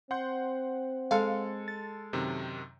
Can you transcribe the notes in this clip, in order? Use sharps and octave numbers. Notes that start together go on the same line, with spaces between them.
C4 F#5 C6 G6
G#3 A4 F5
A6
F#2 C3 D#3